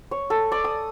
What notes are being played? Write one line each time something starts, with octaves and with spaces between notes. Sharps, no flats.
C#5
A4
D5
D#6